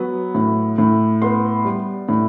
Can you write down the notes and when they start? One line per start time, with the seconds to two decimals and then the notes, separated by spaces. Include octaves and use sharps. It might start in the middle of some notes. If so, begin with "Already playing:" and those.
Already playing: F#3 B3
0.35 A2
0.78 A2
1.22 B3 C6
1.65 G3
2.09 A2